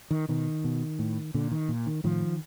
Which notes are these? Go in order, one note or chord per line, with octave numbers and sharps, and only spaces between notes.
D#3
B2 D#3
B2
A2
A#2 D3
D#3
A#2
D#3
A2 D#3 F3